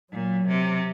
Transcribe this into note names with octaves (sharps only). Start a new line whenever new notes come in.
A#2 F#3
C3